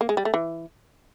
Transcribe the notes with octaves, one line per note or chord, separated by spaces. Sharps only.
A#3
G#3
G3
A3
E3